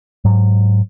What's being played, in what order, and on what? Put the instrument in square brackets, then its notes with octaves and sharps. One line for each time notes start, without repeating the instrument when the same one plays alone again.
[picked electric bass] G#2 F#3